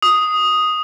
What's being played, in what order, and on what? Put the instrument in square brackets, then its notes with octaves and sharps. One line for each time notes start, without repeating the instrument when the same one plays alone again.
[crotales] D#6